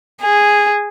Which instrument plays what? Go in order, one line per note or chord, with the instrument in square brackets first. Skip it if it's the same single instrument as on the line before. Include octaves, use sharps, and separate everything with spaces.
[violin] G#4